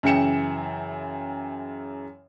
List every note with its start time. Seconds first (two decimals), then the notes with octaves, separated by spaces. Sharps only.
0.03 F#2 C#3 E3 G5 C#7 E7